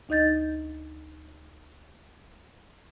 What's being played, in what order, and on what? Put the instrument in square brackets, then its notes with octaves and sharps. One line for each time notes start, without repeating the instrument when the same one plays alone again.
[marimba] D2 D#4 D#5 G6 A6